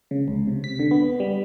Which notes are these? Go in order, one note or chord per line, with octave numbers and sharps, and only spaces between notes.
C#3
C#2
C3
B6
D3
B3
G3